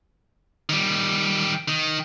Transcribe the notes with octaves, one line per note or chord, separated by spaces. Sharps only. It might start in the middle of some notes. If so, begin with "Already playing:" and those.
D#3 G3
D#3 D#4